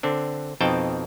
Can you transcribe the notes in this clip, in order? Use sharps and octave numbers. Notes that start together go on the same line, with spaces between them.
D3 C4 D4
F2 B2 C4 D#4 G5 A5